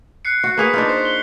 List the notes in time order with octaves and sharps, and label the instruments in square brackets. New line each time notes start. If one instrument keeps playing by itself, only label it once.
[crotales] F#6 C7 C#7
[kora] F#4
[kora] A#3 G#4 F5 [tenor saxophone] B4 [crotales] C#6 B6 F7
[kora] D4 D#4 F4 [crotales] G6
[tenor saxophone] C5
[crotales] G7